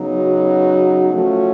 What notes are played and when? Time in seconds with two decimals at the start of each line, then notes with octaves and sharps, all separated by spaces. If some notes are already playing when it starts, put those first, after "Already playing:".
Already playing: C#3 F#3 B3 D#4
0.16 F#4
1.13 F3 A3 C#4